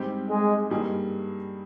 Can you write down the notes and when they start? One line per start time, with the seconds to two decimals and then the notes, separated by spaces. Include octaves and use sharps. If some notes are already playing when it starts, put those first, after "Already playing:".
Already playing: G#2 G3 C4 G4
0.30 G#3
0.70 G2 G3 A#3 D#4 G#4